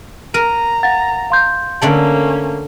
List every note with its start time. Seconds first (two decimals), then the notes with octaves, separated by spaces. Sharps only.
0.34 A#4 A#5 D#7
0.83 F5 F#5 A6
1.30 F5 C6 G6
1.82 D3 A3 A#3 C#4 D5 A5